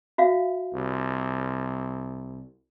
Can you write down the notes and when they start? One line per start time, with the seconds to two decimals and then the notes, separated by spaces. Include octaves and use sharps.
0.18 F#4 E5 F5
0.74 C2